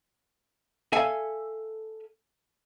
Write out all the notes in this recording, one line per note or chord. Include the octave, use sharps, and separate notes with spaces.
A4 E5 F5 G#5